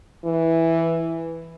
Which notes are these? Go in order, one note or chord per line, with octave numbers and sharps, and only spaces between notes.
E3